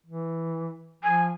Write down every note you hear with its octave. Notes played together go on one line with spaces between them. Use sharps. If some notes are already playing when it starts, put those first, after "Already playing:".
E3
F3 G#5